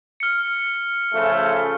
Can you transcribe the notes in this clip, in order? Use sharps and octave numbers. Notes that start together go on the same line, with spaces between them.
F6 C#7
C#3 F3 A3